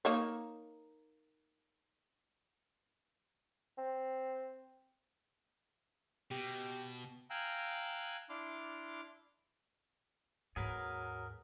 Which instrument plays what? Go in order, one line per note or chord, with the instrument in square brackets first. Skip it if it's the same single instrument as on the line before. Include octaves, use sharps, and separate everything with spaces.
[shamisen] A#3 D#4 C#5
[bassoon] C4
[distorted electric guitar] B2 [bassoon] G4
[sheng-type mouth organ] F5 G5 G#5 A#5 E6 F#6
D4 E4 C6 D6 F6
[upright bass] D#2 G#2 [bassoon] F#3 [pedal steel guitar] G#4 A#4 B4